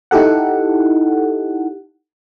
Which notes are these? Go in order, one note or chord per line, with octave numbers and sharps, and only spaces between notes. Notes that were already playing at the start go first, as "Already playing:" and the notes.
D#4 E4 G4 A4 F#5